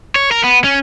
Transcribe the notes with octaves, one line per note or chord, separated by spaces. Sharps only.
C#5
A#4
B3
C#4